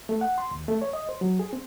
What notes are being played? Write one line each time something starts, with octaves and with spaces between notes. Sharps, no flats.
A3
F#5
C6
D#2
A3
C#5
D#5
C5
F#3
G#4
C4